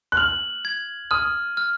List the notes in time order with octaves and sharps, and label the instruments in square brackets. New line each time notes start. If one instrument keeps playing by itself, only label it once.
[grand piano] F#6
[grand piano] F6 [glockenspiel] F#7
[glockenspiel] G#6
[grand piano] D#6 [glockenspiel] F6
[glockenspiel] F6